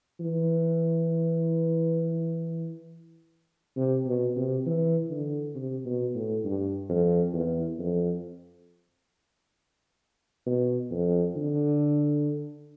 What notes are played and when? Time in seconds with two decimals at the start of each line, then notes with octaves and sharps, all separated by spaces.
0.20 E3
3.76 C3
4.06 B2
4.36 C3
4.66 E3
5.10 D3
5.55 C3
5.85 B2
6.15 A2
6.44 G2
6.89 F2
7.33 E2
7.79 F2
10.46 B2
10.91 F2
11.36 D3